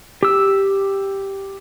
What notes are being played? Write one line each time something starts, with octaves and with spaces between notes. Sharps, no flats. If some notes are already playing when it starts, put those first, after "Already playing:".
G4 E6